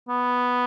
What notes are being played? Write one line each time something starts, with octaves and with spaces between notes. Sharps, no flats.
B3